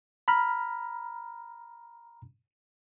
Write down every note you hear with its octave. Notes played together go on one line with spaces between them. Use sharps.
A#5 B5 F6